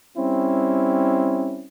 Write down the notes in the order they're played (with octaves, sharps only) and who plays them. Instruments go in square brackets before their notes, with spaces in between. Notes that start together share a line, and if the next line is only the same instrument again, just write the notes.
[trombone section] G3 C4 C#4 E4